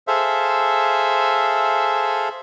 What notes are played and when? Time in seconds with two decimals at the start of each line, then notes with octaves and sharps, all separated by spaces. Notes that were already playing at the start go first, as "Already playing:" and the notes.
0.08 G#4 A4 C5 E5 F5